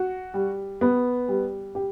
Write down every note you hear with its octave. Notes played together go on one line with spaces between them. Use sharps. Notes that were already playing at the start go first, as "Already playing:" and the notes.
Already playing: F#4
G3
B3
G3
G4